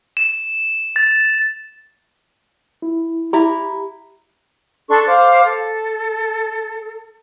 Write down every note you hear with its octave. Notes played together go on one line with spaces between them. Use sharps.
E7
A6
E4
E4 G4 A#5
D4 A4 C6 C#6
C5 F5 D6
A4